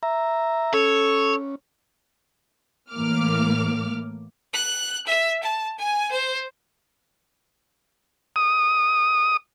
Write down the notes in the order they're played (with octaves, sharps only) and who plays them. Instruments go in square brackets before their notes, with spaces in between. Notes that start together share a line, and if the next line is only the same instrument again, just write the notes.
[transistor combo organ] E5 A#5
[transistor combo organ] C#4 [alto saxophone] A4 [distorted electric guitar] C#5
[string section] A2 E3 A#3 D6 F6
[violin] F#6
E5
A5
G#5
C5
[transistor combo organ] D#6